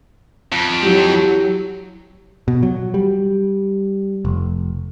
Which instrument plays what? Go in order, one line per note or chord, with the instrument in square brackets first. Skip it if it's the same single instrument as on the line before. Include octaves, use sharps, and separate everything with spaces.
[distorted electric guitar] F2
[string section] F#3 [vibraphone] E4 G4
[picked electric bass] B2
F#3
G3
F1